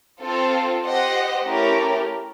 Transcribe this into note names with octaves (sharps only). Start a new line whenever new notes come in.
C4 F4 A4
G4 C5 D#5 F#5
A3 C#4 E4 G4 A#4